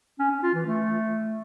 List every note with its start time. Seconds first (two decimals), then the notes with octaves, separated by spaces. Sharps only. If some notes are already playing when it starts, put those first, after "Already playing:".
0.19 C#4
0.31 C#4
0.43 F4
0.54 E3
0.66 A3